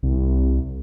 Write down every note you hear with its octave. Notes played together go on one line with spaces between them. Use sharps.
C2